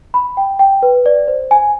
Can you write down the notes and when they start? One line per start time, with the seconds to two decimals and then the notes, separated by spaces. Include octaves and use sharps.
0.14 B5
0.37 G5
0.59 G5
0.82 B4
1.06 D5
1.28 C5
1.51 G#5